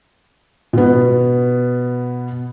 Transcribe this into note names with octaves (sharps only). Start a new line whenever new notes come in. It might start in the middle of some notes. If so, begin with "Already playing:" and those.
B2 B3